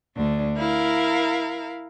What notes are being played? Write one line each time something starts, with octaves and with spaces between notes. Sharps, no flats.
D2 D4
E4 A#4 F5